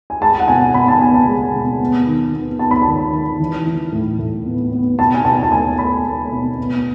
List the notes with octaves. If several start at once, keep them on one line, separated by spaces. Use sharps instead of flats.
G#5
G#3 A5
F#5
B2 G#5
B2 B5
A5
B3 G#5
A5
G#3
B2
B3
D#3
B3
B3 A5
B5
D#3 A5
D#3
E3
E3
A2
A2
B3
B3
B2 A5
G#5
B2 A5
A5
A3 G#5
A3 B5
A3
B2
B3